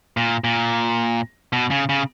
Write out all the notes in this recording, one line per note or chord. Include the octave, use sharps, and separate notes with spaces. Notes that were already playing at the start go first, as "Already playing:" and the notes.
A#2
A#2
B2
C#3
C#3